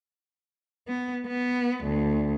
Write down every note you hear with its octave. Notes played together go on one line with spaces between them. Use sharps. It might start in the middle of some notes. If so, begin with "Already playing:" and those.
B3
B3
D2